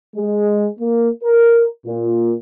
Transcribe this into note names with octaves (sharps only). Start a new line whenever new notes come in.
G#3
A#3
A#4
A#2